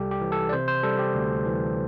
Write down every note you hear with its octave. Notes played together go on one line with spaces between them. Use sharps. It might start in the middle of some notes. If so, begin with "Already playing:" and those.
Already playing: C2 C3 G3 G4 A4
G4
E3
A4
D5
C3 C5
C5
G3 A4
G4
D2
E3